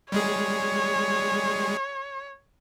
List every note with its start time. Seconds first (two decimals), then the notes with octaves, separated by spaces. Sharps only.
0.12 G3 G#3 G#4 C#5